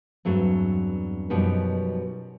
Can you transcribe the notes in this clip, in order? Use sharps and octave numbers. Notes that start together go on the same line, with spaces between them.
E2 G2 F#3 A3 C4
F#2 B2 F3 G3 B3 D#4